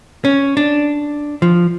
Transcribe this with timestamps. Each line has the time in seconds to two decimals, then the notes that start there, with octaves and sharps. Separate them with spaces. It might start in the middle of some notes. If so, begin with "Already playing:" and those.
0.25 C#4
0.57 D4
1.42 F3